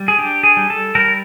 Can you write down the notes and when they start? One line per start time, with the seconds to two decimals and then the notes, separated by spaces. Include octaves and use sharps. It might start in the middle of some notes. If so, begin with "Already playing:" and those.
Already playing: G3
0.08 G#4
0.18 D4 G4
0.43 G#4
0.57 G3
0.70 A4
0.95 G3 A#4